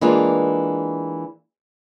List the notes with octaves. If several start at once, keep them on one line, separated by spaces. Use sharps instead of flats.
E3 G#3 A#3 D4 F4